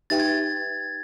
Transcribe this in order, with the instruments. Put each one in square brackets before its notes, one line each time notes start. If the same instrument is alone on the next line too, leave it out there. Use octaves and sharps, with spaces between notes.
[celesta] D#4 G4 B4 E5 G5 [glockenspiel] A6
[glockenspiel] G#6
A6